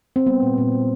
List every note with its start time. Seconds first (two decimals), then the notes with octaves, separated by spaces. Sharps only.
0.16 C4
0.26 G3 B3
0.42 A#2
0.57 A#2
0.72 G3